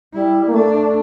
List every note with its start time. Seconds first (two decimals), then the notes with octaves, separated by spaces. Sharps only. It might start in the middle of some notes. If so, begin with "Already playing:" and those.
0.13 G3 E4
0.47 A#3
0.54 A3 D4